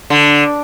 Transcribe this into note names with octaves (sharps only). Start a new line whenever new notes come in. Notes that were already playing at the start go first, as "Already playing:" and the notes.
D3